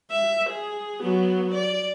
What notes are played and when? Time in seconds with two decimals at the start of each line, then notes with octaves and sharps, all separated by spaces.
0.11 E5
0.50 G#4
1.03 F#3 B3
1.54 D5